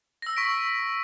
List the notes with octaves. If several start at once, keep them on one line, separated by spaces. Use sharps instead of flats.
E6 A#6
C#6 B6 D7